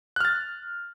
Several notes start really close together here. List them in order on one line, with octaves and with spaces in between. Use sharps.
F#6 F6 A6